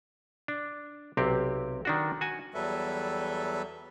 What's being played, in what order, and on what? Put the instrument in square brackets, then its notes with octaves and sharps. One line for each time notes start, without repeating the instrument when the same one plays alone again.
[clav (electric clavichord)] D4
B1 C3 C4 G4
D#3 D4 F#4
F#4 G#5
[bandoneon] E2 F#3 G3 A4 B4 E5